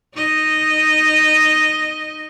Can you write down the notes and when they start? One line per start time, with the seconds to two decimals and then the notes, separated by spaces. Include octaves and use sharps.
0.14 D#4 D#5